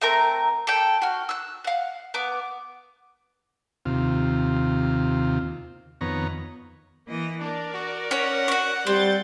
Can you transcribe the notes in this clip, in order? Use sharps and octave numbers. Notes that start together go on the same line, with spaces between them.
A3 C4 A#4 A#5
A4 G5
F#4 F6
E6 F#6
F5 F#5
B3 D6
D#2 C3 F4
F2 D#3 B3 C#5 A#5
E3 A#3 D#5
D4 A#4 D5
F#4
C#4 C#5 F#5
F#4 C#6
G3 C4 C6 G6 A6